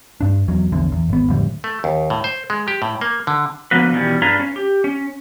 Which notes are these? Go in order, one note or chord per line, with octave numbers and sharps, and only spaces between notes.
G2 D4
E2 F#3
A#1 E2 D3
E2
G#1 B3
F2 A2 D3 G3
A3
D#2
A2
C5
G#3
G4
A2
A#3
D3
D3 F3 A#3 B3 F#4 B4
B2 D#3 E3 G3 C#4
G2 D4 F4 G#4 B4 A#5
C#4
G4
C#4